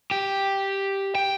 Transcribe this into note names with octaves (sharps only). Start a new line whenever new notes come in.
G4
G5